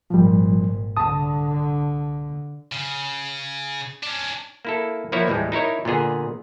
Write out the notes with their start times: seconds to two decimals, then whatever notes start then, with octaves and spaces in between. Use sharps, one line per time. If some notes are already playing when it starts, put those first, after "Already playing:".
0.10 G#1 A#2 F3 G3
0.97 C2 D3 A5 D#6
2.72 C#3
4.03 C#4 D4
4.65 A#3 E4 A4
5.12 F3 A#3 B3 E4 C#5
5.27 D#2 A2 E3 G3 G#3
5.52 D#4 E4 A#4 C#5
5.85 A#2 D3 B3 G#4